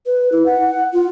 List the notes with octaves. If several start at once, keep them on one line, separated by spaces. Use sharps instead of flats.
B4
E4
F#5
F4